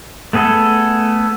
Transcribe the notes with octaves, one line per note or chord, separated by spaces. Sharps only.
A3 B3 G#4 A4